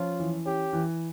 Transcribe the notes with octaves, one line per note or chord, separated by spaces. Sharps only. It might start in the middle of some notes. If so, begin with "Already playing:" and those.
Already playing: F3 C#4 F4
E3
C#4 G4
E3